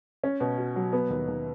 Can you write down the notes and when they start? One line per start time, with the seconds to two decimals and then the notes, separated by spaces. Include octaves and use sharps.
0.24 C#4
0.40 B2
0.58 F#4
0.76 F#3
0.93 B3
1.10 D#2
1.28 D#2